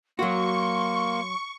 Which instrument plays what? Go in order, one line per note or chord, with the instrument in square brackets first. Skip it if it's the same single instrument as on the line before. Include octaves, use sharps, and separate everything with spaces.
[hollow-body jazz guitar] F#3 F#4 [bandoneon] A#3 [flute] C6 [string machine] C#6